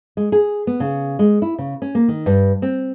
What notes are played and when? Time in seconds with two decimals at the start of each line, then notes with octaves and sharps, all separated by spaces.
0.17 G#3
0.32 G#4
0.67 B3
0.80 C#3
1.19 G#3
1.42 E4
1.58 C#3
1.82 C#4
1.95 A#3
2.08 D#3
2.26 G2
2.62 C4